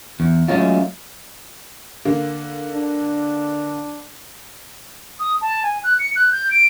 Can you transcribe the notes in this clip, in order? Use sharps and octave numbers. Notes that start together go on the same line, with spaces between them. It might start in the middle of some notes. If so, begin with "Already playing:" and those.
E2
F#3 G#3 A3 C#4 D#4 F4
D3 A#3
D4
D#6
A5
G#5
F#6
C#7
F#6
G6
D7